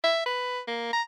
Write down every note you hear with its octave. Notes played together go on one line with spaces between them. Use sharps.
E5
B4
A#3
A#5